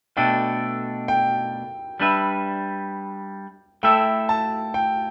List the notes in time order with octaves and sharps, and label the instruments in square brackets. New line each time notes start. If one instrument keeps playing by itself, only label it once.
[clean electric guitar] B2 A3 D4 A4 [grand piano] G5
[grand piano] G5
[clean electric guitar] G3 D4 B4 E5
[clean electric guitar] A3 E4 A4 E5 [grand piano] G5
[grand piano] A5
G5